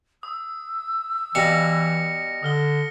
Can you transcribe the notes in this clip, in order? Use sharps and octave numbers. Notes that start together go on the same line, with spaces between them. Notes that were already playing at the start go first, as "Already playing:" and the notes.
D#6 E6
B2 E3 G3 F5 A#6 C#7
D3 D#6 F6 G7